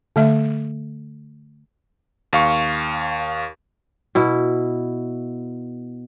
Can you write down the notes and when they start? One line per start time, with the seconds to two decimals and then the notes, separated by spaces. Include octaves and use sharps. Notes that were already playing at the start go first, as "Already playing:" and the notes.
0.16 D3 A3 E5
2.33 D#2 F5 C#6
4.15 B2 E4